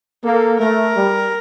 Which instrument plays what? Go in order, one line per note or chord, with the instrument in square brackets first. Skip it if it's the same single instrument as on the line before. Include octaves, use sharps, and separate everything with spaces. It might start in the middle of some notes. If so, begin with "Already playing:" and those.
[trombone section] A#3 [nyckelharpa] A4
[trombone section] A3 [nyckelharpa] A#4
[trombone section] G3